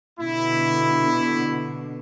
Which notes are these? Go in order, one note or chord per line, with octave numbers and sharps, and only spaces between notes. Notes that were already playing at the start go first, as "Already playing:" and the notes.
B2 D3 E4